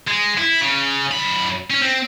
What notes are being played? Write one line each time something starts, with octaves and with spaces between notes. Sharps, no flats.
G#3
E4
C#3
F#2 B5
C#4
C4